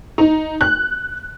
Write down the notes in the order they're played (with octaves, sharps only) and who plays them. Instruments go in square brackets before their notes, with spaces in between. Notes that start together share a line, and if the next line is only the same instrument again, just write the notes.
[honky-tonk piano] D#4
F#6